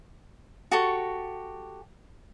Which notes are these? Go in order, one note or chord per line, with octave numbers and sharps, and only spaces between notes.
F#4 G4 A4 C#6